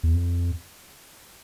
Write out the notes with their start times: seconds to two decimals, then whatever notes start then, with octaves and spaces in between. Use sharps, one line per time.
0.03 E2
0.15 F2